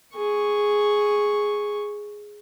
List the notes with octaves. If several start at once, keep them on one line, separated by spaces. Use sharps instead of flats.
G#4 C#6